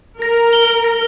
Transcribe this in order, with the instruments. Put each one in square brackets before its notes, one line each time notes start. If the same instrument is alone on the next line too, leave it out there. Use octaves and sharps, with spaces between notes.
[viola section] A#4 [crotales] A#6
[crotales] G7
A#6